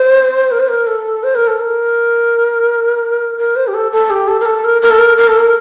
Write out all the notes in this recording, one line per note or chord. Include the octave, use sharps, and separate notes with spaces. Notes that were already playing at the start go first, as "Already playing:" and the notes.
Already playing: C5
A#4
C5
A#4
A4
C5
A#4
A4
A#4
A#4
C5
G4
A4
A4
G4
A4
A#4
A4
A#4
A#4
A4
A#4
A#4
A4
A#4